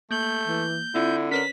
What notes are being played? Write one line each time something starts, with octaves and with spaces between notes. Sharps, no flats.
A3 A#3 G6 F#7
E3
D3 C4 E4 F4
C#4 A#4 B4 C#5 B6